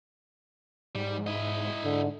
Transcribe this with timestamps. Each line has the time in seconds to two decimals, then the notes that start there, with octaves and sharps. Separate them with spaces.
0.95 G#2 G3
1.27 E4 D#5
1.84 G#2 D3